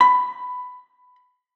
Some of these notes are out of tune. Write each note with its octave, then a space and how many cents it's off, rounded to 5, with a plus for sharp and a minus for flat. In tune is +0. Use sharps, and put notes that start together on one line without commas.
B5 +15